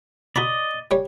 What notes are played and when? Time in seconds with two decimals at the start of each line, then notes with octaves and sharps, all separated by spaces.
0.36 F#4 D5 D#5 A#5 B5
0.91 G3 C#5